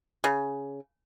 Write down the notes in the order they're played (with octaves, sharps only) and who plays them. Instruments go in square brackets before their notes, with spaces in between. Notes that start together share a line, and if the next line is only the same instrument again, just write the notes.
[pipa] C#3